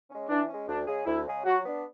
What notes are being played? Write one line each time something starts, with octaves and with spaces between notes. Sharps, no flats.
G#3 C#4
E3 D4
G#3 C#4
D2 D4
C#3 G#3 C#4 G#4
D2 E4
C#3 G#3 C#4 G#4
F#3 F#4
B3 D4